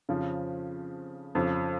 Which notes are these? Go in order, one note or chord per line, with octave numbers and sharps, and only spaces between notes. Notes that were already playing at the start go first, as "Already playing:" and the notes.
F2 C#3 F3
F2 C#3 F3